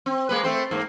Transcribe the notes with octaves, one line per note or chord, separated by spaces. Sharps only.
C4
G#3 A#3 B4
A3 C4 C5
G#2 A#3